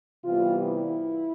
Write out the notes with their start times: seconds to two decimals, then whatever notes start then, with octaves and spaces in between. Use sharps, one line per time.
0.23 C3 E3 G3 B3 F4
0.66 E4